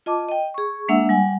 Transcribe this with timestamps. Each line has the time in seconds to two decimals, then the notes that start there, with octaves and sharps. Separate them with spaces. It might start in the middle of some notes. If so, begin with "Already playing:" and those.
0.06 F4 D#5 A5 D6
0.29 D#5 G5
0.54 G#4 C#6
0.88 G#3 A#3 D4 E5 F#5 E6
1.09 G3 F#5 G#5